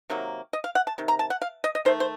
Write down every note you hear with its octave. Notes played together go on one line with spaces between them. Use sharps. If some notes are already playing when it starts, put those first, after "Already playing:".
C3 D#3 F#3 A#3
D#5
F5
F#5
A5
C3 D#3
A#5
A5
F#5
F5
D#5
D#5
D#3 A3 C5
C5